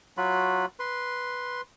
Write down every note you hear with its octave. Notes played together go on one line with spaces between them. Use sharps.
F#3 F4 F#4 B5
B4 C6